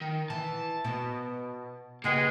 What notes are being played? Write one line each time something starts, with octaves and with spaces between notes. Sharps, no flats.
D#3
E3 A5
B2
C#3 G#3 A#3 F#4 G4 B4